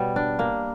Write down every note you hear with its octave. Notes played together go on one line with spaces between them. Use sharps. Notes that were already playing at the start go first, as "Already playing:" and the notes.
Already playing: B2 G3 C#5
D4
A#3